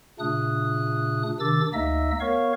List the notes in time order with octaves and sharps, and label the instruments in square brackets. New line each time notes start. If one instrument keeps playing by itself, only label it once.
[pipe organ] A#2 C#3 A3 D4 D#6 F#6
C3 D#3 D4 D6 E6 A6
D2 A#3 D#4 D#5 E5 E6
B3 A#4 C#5 F5 C#6